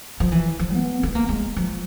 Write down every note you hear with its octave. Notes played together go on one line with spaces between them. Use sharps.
F3
E3
F3
B3
B3
A#3
G#3
F3